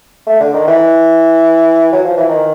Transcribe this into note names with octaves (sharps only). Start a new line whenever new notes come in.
A3
D3
D#3
E3
F#3
F3
E3
D#3